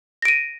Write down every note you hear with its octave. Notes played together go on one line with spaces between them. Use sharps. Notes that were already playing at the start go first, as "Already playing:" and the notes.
A#6 D7 D#7